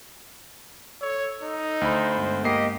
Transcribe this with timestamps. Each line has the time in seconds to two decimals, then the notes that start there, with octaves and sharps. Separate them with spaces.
1.02 A4 C#5
1.43 D#4
1.81 D2 C5 B5
2.14 G2 G#3 B3
2.44 A#3 G4 D#5 C7